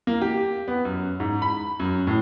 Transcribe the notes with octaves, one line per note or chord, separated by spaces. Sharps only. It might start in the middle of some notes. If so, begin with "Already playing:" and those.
A#3
G4
B3
F#2
G#2
B5
F#2
A2